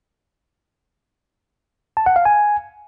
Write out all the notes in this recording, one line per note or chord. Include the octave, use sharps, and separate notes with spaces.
A5
F#5
F5
G#5